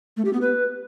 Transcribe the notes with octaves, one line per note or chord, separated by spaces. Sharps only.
A3
G4
B3
B4